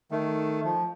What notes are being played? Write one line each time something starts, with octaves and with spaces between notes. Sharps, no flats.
D#3 A3
F3